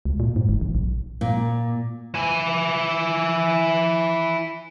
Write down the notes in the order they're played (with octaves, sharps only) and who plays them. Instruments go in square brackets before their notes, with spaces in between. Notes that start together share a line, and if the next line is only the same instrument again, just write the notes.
[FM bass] C#2
A#2
G#2
G1
A1
B1
[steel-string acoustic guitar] A#2
[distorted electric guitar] E4 G#5